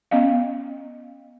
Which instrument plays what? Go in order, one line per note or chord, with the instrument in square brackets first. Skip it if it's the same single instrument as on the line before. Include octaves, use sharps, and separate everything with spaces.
[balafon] B3 C#4 D#5 F5